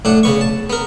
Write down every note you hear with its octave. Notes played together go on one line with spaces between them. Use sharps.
A2 D4 F#5
C#3 B3 C#6
A5
B3 A#4